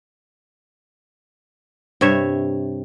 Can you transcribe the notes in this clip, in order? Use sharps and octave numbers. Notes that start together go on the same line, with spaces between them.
G2 C3 C#5 E5